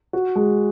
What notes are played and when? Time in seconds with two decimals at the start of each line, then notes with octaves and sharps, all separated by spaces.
0.13 F#4
0.35 G#3